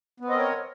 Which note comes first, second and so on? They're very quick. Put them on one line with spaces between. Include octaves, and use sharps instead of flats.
B3 C4 D#5 A#4 C#5